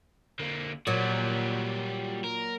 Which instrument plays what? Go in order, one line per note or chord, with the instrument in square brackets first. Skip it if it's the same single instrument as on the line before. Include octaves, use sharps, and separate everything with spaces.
[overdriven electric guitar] D3 A#3
[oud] A#2 F#3 [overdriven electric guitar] G3 F#4
[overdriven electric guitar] A#4